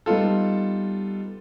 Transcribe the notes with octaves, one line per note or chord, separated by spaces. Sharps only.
G3 B3 D#4 F4 A4